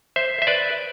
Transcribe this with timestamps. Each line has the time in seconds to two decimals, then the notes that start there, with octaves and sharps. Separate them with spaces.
0.16 C5 E5
0.42 E5
0.47 B4 D5